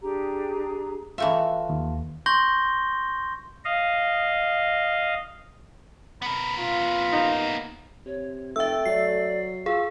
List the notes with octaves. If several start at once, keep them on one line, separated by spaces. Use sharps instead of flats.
D4 G4 G#4 A#5
E3 A3 F4 F#4 A4 E5
D#2
C6 C#6 G6 A#6 G7
D#5 F5
B3 A#4 B5
F4
D#2 A#3 D#4
C3 C#5
F1 A3 E5 G5 E6
F#3 D5 C7
F4 G#4 E6